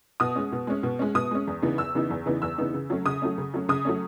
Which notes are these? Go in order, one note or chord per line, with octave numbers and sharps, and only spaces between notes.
B2 D#6
G#3 C#4
B2
G#3 C#4
B2
G#3 C#4
B2 D#6
G#3 C#4
E2
C#3 E3 B3 D#4
E2 E6
C#3 E3 B3 D#4
E2
C#3 E3 B3 D#4
E2 E6
C#3 E3 B3 D#4
C#3
F#3 A3 C#4
C#3 D#6
F#3 A3 C#4
C#3
F#3 A3 C#4
C#3 D#6
F#3 A3 C#4